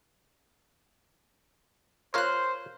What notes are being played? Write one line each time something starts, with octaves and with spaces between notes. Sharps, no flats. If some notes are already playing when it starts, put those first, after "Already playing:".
F4 A#4 C5 C#5 F6 F#6